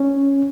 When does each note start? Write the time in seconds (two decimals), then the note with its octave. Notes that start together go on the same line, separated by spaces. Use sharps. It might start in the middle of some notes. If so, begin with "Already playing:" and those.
Already playing: C#4